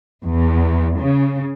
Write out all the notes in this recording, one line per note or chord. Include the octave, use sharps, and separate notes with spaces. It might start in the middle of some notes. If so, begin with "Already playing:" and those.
E2
C#3